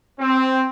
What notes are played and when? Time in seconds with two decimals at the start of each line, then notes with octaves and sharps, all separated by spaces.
0.19 C4